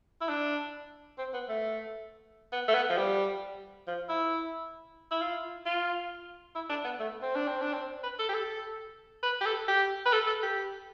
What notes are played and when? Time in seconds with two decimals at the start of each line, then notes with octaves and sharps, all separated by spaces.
0.21 E4
0.29 D4
1.18 C4
1.33 B3
1.49 A3
2.52 B3
2.68 A3
2.74 B3
2.90 F3
2.98 G3
3.87 F3
4.09 E4
5.11 E4
5.21 F4
5.66 F4
6.55 E4
6.69 D4
6.84 B3
7.00 A3
7.22 C4
7.35 D4
7.47 C4
7.61 D4
7.73 C4
8.03 B4
8.19 A4
8.29 G4
8.34 A4
9.23 B4
9.41 G4
9.46 A4
9.68 G4
10.05 B4
10.12 A4
10.27 A4
10.43 G4